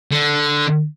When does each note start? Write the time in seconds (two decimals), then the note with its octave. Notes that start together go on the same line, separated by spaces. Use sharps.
0.12 D3